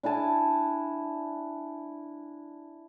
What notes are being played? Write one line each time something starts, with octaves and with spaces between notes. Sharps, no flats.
D4 E4 G#5 A5